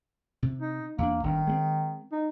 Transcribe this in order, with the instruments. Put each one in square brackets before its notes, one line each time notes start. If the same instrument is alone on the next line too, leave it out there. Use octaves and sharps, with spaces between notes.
[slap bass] C3
[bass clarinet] D#4
[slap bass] E2 D4 [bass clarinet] A#3
[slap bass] G1 D4 [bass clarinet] D#3
[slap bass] G#3 B3 C4
[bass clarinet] D#4